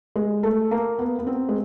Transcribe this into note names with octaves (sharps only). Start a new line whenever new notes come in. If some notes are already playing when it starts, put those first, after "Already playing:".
G#3
A3
A#3
B3
B3
C4
G#3